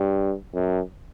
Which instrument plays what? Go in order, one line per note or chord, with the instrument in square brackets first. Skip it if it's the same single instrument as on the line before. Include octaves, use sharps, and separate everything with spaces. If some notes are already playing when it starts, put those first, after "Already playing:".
Already playing: [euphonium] G2
F#2